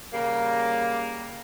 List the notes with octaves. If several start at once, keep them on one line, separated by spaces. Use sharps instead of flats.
C#3 G3 A#3